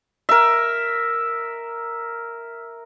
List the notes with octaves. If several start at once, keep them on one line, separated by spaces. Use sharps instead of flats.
A#4 E5